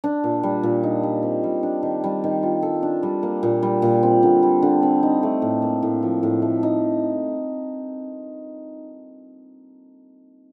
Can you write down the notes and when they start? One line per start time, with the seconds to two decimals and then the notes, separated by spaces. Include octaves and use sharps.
0.04 D4
0.24 A#2
0.43 G3
0.63 A#2
0.83 D#4
1.03 G3
1.23 C4
1.43 G3
1.63 D4
1.83 D#3
2.04 G3
2.24 D#3
2.43 F4
2.62 A4
2.83 D4
3.03 G3
3.23 A#3
3.43 A#2
3.63 G3
3.82 A#2
4.03 C4
4.23 D3
4.43 G3
4.63 D3
4.83 C4
5.03 D#4
5.23 A3
5.42 A2
5.62 A#3
5.83 A2
6.03 F3
6.23 A2
6.42 A3
6.63 D#4